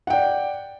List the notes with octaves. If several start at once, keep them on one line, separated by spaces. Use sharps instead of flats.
D5 F#5 G5